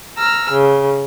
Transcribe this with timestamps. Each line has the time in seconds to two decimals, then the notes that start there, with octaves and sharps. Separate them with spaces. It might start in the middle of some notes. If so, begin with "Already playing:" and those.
0.17 A#5 E6 F6
0.52 C#3